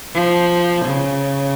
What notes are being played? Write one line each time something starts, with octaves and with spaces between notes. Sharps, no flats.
F3
C#3